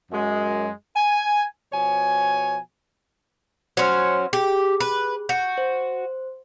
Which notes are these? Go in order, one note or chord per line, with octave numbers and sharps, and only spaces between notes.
F#2 G#3
G#5
B2 F3 C#5 G#5
F#3 C#4 C5 C6 F6
G4 G#4
B4
F#4 G6
C5